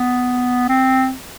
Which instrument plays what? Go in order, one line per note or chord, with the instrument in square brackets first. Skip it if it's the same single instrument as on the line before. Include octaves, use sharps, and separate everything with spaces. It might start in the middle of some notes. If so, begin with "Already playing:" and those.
Already playing: [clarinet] B3
C4